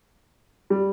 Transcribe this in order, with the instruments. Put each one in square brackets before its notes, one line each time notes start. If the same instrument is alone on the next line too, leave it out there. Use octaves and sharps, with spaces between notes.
[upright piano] G3